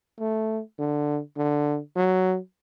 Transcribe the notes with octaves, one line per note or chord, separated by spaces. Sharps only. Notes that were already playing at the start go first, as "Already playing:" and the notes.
A3
D3
D3
F#3